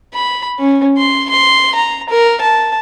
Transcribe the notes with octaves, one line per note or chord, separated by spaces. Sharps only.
B5
C#4
C6
C6
A#5
A#4
A5